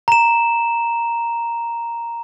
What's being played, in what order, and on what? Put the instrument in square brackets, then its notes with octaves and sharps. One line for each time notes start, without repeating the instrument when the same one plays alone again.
[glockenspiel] A#5 E7